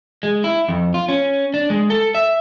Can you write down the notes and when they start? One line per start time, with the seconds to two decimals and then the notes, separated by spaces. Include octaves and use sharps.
0.23 G#3
0.44 E4
0.68 F2
0.94 F4
1.08 C#4
1.54 D4
1.70 G#3
1.90 A4
2.15 E5